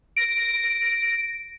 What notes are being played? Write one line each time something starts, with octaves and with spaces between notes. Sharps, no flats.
A#6 D7